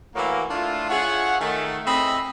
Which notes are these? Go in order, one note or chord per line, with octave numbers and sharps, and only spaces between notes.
A2 E3 F#3 A#3
A3 D4 E4 F4
F4 G#4 C#5 E5 F#5
D#3 A3
A2 C4 G#4 D#5 E5 B5